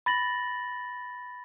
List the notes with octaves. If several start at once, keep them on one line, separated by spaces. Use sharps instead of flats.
B5 A6 A#6 F#7